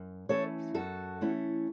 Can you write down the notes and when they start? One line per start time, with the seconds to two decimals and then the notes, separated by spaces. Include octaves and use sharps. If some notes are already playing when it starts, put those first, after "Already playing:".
Already playing: F#2
0.29 E3 A3 C#4 E4 A4 C#5
0.74 F#2 F#4 A4
1.21 E3 A3 C#4 E4